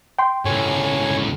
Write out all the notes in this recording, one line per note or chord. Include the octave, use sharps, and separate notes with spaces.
G5 C6
C#2 A2 C#5 G#5